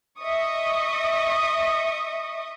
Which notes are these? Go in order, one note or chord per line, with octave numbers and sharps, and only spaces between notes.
D#5 E5 C#6 D#6